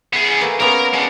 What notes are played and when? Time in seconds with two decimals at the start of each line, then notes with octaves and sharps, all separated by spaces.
0.13 B3 G#4
0.41 A3 A#3 B4
0.60 A#3 B3 C#4 A#4 A#5
0.93 G#3 D4 F#5